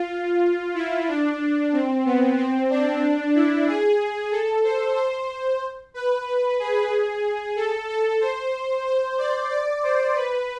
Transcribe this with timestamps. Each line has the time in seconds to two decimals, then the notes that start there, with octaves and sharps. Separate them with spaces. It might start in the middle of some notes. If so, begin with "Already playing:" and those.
Already playing: F4
0.75 E4
1.08 D4
1.73 C4
2.05 B3
2.37 C4
2.70 D4
3.35 E4
3.68 G#4
4.31 A4
4.64 C5
4.96 C5
5.94 B4
6.59 G#4
7.56 A4
7.89 A4
8.21 C5
8.86 C5
9.18 D5
9.51 D5
9.83 C5
10.16 B4